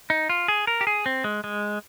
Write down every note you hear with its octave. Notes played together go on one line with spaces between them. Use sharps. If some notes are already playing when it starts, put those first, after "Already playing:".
D#4
F4
G#4
A#4
G4
G#4
C4
G#3
G#3